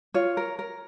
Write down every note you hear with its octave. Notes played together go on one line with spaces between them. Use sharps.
F4 C#5
A#4
A#4